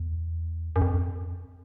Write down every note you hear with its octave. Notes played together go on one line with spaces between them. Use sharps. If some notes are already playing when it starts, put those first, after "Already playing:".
Already playing: E2
F#2
F2